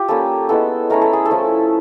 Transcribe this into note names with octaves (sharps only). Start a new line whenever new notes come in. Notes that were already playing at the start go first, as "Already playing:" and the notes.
Already playing: F4 G4
G3 A#3 C#4 A4
G#3 B3 E4 A4
A3 C#4 E4 A#4
A4
G#4
A4
F3 A3 C#4 E4